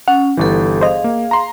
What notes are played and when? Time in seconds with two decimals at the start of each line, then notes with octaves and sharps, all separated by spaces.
0.08 C#4 F#5
0.37 G1 E3 G4 A4
0.81 G#4 C5 D#5 F5
1.04 A#3
1.31 A#5 C6